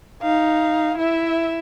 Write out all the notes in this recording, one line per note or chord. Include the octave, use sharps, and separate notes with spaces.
D#4 F5
E4 E5